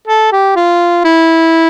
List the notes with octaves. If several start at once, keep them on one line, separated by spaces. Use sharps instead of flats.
A4
G4
F4
E4